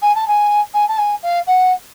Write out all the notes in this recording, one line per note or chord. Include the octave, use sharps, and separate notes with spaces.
G#5
A5
G#5
G#5
A5
G#5
F5
F#5